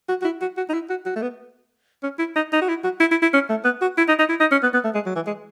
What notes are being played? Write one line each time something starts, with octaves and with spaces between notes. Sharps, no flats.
F#4
F#4
E4
F#4
F#4
D#4
E4
F#4
F#4
A3
B3
C#4
E4
D#4
D#4
F#4
E4
F#4
E4
E4
E4
C#4
A3
B3
F#4
E4
D#4
D#4
E4
D#4
C#4
B3
B3
A3
G#3
F#3
E3
G#3